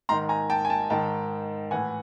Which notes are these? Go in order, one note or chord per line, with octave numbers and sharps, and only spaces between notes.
G#2 D#3 A#5 C6
G#5 A#5
G5 A5
G#5
G5 A5
G#2 D#3 G5 A5
A2 E3 F#5 G#5